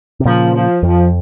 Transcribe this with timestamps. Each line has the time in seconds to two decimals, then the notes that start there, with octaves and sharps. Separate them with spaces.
0.20 C3
0.25 A#2 C#3 F3
0.54 F3
0.83 F2 F3